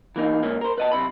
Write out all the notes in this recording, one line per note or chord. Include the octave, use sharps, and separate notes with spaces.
E3 A#3 D#4
G#2 A#3 C#4
A#4 C5
B4 D#5 A5
B1 C3 E4 B5